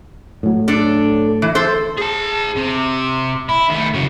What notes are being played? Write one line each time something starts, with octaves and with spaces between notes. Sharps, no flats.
A2 F#3
D4 A4
E3
A4 C5
G#4 A5
C3
E4
D#3 A3
C#3 F#3